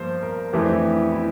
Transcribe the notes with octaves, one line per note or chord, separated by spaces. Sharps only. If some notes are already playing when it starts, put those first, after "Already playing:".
Already playing: G2 F3 A#3 A#4 C5
A#4
A#4
F2 E3 A3 C4 G4
D4
E4
E4
E4